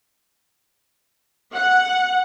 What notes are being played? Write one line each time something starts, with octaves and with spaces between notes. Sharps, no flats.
F#5